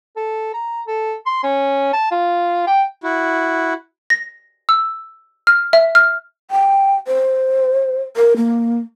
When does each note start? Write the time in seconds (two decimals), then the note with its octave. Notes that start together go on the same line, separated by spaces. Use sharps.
0.17 A4
0.54 A#5
0.87 A4
1.26 C6
1.43 C#4
1.93 A5
2.11 F4
2.67 G5
3.02 E4 F#4
4.10 A#6
4.69 E6
5.47 F6
5.73 E5
5.95 F6
6.51 G5
7.07 C5
8.17 A#4
8.36 A#3